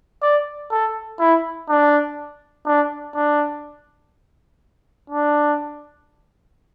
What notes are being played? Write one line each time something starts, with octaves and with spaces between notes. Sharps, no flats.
D5
A4
E4
D4
D4
D4
D4